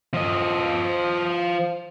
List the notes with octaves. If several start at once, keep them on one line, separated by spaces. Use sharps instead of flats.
F3 D#5